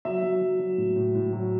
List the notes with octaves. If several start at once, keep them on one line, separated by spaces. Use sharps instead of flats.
F#3 E5
F#3
F#3
F#3
A2
A2
A2
F#3